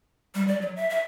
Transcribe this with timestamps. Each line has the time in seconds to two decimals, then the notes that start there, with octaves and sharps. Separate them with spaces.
0.35 G3
0.47 D5
0.62 F#3
0.76 E5
0.90 E5